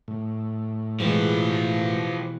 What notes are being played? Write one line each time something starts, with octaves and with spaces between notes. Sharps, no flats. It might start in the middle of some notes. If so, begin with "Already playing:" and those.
A2
B2 E3 F3 G#3 G4